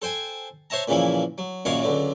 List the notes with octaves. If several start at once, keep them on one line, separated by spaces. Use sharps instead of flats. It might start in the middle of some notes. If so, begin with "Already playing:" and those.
A4 C5 G5 G#5
C5 C#5 E5 A5 A#5
A#2 C#3 E3 F3 E4
F#3
A#1 F#2 D#3 F#4 C#5 F5
C#2 D3 F#3